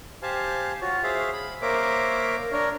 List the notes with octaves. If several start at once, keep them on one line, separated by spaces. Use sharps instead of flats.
G4 C5 F5 G#5 A5
F4 F#4 C#5
G#4 C5 E5 F5
B5
A#3 A#4 C5 C#5 E5 D6
D4 A#4 C#5